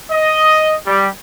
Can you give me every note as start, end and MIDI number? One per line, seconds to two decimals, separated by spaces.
0.11 0.73 75
0.87 1.07 55